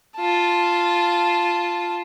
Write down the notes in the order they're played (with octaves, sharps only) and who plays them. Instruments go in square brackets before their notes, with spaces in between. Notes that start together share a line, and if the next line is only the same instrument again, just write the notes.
[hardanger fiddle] F4 A5